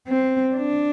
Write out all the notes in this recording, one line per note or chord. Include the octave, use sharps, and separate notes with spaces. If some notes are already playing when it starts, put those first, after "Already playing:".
C4
D4